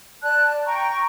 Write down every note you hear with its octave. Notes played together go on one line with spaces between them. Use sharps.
D5 A5 F#6
G5 A#5 C#6